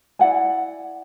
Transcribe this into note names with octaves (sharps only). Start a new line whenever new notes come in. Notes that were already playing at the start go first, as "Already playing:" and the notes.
E4 D5 F#5 G#5